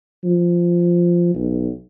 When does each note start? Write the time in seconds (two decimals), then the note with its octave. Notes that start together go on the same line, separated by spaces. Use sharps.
0.24 F3
1.34 B1